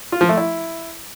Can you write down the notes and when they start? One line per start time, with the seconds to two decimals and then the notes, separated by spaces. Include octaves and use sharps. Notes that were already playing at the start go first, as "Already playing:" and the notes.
0.12 F4
0.21 F3
0.29 A3
0.37 E4